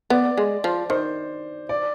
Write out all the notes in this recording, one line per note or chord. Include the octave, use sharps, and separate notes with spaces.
B3 D5
G#3
F3
D#3 C5
D5